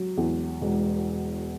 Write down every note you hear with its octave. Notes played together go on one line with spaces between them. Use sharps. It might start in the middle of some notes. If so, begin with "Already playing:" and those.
Already playing: F#3
E2
E1